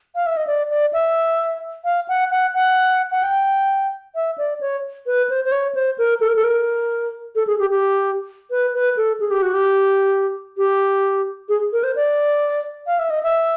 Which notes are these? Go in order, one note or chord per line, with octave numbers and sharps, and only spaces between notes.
F5
E5
D#5
D5
D5
E5
F5
F#5
F#5
F#5
F#5
G5
E5
D5
C#5
B4
C5
C5
C#5
C5
A#4
A4
A#4
A4
A#4
A4
G#4
G4
G4
B4
B4
A4
G#4
G4
F#4
G4
G4
G#4
A#4
C5
D5
F5
E5
D#5
E5